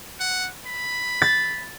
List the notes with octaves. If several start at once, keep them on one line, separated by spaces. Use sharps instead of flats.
F#5
B5
A6